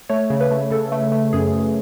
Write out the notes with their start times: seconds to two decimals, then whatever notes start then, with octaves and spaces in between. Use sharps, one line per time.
0.09 A3 C#5
0.30 C#3
0.41 B4
0.51 A3
0.71 C#3 A4
0.92 A3
1.12 A3
1.33 F#2 G#4
1.53 F#2